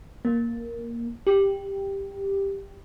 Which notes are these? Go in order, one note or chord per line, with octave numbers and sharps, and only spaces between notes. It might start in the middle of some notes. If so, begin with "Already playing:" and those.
A#3
G4